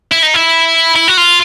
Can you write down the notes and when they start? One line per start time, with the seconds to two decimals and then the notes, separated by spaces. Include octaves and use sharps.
0.12 E4
0.23 D#4
0.34 E4
0.96 E4
1.08 F#4
1.17 F4